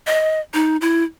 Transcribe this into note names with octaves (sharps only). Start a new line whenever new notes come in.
D#5
D#4
E4